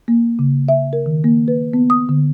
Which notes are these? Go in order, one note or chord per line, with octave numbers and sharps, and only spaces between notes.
A#3
C#3
E5
A#4
D#3
A#3
B4
B3
D#6
D3